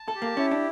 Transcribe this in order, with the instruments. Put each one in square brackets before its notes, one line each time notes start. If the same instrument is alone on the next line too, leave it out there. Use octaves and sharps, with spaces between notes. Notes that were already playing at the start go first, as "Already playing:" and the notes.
Already playing: [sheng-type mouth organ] A5
[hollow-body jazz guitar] A4
[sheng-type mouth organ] G4
[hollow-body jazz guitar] A#3
[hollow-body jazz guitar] C#4 [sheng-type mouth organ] E4
[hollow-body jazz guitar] D4